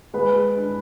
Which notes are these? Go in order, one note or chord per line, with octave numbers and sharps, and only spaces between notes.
G#3 B4
D4